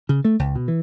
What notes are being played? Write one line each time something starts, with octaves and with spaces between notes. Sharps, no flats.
C#3
A3
C#2
B2
E3